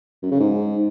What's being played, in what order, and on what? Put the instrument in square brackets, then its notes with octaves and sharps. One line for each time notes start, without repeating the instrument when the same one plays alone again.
[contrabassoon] F#2
C#3
G#2